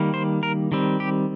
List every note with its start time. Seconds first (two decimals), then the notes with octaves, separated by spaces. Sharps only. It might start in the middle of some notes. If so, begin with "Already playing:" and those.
Already playing: D#3 G3 A#3
0.14 C5
0.43 A#4
0.72 D#3 G3 C4
1.00 G4